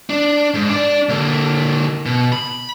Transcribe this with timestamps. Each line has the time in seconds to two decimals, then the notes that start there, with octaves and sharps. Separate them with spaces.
0.10 D4
0.54 G#2
0.69 D4 D5
1.09 D3 A#3
2.06 B2
2.32 B5